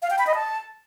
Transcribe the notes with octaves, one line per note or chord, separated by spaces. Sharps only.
F5
G5
B5
D#5
A5